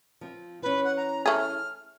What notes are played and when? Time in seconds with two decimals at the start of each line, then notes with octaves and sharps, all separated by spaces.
0.21 F3 C4
0.62 E3 C#4 B4
0.84 F#5
0.96 A#5
1.26 A3 G#4 F6